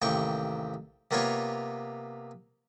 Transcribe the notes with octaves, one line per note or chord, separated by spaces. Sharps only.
A1 D#2 C3 G5 C#6
C3 A#3 B3 F4 C#5 C#6